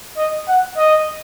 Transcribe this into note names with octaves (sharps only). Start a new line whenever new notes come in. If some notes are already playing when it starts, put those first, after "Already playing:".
D#5
F#5
D#5